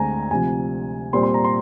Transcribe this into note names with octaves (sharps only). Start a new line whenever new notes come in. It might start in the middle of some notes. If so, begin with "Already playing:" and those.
Already playing: D2 D3 G#3 C4 G#5 A#5
D2 C3 F3 G#5
A#2 G3 C4 C6
C6
A#5
C6